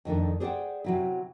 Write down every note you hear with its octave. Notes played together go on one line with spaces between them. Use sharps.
F2 D#3 A3 D4
G#4 C5 D5 D#5 F#5 G5
C3 F#3 E4